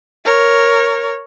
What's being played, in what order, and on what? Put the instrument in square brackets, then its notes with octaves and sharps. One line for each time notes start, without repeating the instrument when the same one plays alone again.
[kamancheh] A#4 C#5